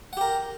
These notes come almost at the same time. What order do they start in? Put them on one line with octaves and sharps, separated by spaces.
F#5 G4 A#4